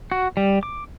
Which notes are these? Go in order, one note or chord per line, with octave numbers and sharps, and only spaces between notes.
F#4
G3
D6